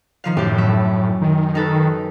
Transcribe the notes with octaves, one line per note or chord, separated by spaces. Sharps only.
D#3 F3 F5
F#2 A2 G4
E5
D#3
D#4 A4 B4